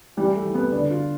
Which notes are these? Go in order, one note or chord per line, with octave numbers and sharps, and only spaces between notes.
E3 G3
A3
E3
B3
D3 D4
F4